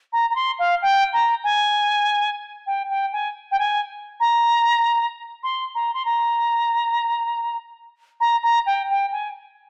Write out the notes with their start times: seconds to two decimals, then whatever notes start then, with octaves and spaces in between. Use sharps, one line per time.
0.12 A#5
0.30 A#5
0.35 C6
0.59 F5
0.82 G5
1.13 A#5
1.44 G#5
2.66 G5
2.90 G5
3.12 G#5
3.51 G5
3.59 G#5
4.20 A#5
5.43 C6
5.75 A#5
5.94 C6
6.05 A#5
8.20 A#5
8.43 A#5
8.66 G5
8.90 G5
9.12 G#5